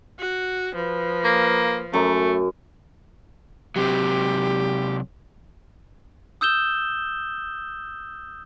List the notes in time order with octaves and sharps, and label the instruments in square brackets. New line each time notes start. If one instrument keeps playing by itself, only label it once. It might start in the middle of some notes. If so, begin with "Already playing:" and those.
[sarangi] F#4
[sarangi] F3 [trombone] B4
[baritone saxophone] A#3
[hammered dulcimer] F#2 [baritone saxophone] A3
[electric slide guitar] C3 F#3 [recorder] G4
[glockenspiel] D#6 E6 G6 E7 G7